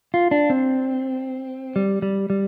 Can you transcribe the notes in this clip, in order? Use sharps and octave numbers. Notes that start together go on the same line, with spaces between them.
F4
D4
C4
G3
G3
G3